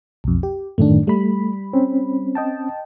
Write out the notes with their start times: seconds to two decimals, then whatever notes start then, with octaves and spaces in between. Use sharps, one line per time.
0.24 B1 F2
0.43 G4
0.78 F#2 A2 D#3 A3 D4
1.07 G3 A3 B5
1.73 C4 C#4
2.35 D#5 G5 A5